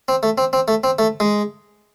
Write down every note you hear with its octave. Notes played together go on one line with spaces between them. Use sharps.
C4
A3
C4
C4
A3
C4
A3
G#3